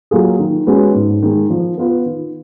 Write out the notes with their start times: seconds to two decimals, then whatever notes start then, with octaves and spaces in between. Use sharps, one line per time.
0.11 F#3 A#3 F4 G#4
0.39 D#3
0.67 G#3 C#4 F#4 B4
0.94 G#2
1.22 D#3 G#3
1.50 F3
1.78 B3 F4 B4
2.05 D#3